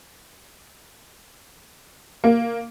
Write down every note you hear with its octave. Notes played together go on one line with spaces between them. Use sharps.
A#3